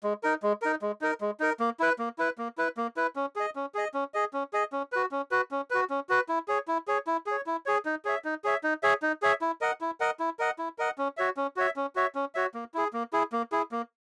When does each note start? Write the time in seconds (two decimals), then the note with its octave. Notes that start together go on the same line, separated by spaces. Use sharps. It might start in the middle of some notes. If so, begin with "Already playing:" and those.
0.03 G#3
0.23 D#4 A#4
0.43 G#3
0.62 D#4 A#4
0.82 G#3
1.01 D#4 A#4
1.21 G#3
1.40 D#4 A#4
1.60 A#3
1.80 E4 B4
1.99 A#3
2.19 E4 B4
2.38 A#3
2.58 E4 B4
2.77 A#3
2.97 E4 B4
3.16 C#4
3.36 G#4 D#5
3.56 C#4
3.75 G#4 D#5
3.94 C#4
4.14 G#4 D#5
4.33 C#4
4.53 G#4 D#5
4.73 C#4
4.92 F#4 B4
5.12 C#4
5.31 F#4 B4
5.51 C#4
5.71 F#4 B4
5.90 C#4
6.09 F#4 B4
6.29 E4
6.48 G#4 C#5
6.68 E4
6.88 G#4 C#5
7.07 E4
7.26 G#4 C#5
7.46 E4
7.66 G#4 C#5
7.85 D#4
8.05 G#4 C#5 E5
8.25 D#4
8.44 G#4 C#5 E5
8.64 D#4
8.83 G#4 C#5 E5
9.02 D#4
9.22 G#4 C#5 E5
9.41 E4
9.61 A#4 D#5 F#5
9.81 E4
10.00 A#4 D#5 F#5
10.20 E4
10.39 A#4 D#5 F#5
10.59 E4
10.78 A#4 D#5 F#5
10.98 C#4
11.17 F#4 C#5 E5
11.37 C#4
11.57 F#4 C#5 E5
11.76 C#4
11.96 F#4 C#5 E5
12.15 C#4
12.35 F#4 C#5 E5
12.54 A#3
12.74 E4 G#4
12.93 A#3
13.13 E4 G#4
13.32 A#3
13.52 E4 G#4
13.72 A#3